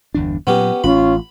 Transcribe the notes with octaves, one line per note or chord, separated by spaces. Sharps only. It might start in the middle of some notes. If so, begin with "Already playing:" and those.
G1 E2 D4
A#2 F#3 B3 C#4 G4
A1 C#4 F4 B5